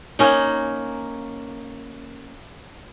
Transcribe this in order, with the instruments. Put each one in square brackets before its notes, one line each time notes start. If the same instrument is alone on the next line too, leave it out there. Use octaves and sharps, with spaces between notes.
[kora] A#3 C#4 D#4